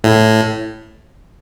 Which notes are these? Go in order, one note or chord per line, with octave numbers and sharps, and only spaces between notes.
A2